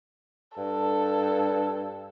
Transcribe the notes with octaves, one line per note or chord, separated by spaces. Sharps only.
G2 A4